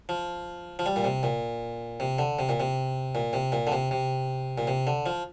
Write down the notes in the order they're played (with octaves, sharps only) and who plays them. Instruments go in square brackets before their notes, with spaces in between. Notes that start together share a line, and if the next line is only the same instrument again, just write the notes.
[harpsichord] F3
F3
G3
A#2
C3
A#2
C3
D3
C3
A#2
C3
A#2
C3
A#2
D3
C3
C3
A#2
C3
D3
F3